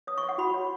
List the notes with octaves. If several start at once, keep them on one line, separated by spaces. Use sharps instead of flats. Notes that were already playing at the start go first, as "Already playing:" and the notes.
C#5 D#6
C#6
C#5
F#5
F#4 B5
C#5